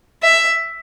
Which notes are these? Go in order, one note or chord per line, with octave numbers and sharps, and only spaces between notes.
E5